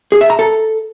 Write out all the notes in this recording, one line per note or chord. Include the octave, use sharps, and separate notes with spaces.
G#4
E5
A#5
A4